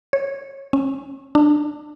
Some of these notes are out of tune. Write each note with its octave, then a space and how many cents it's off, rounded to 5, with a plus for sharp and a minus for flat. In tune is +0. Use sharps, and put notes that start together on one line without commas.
C#5 -20
C#4 -30
D4 +15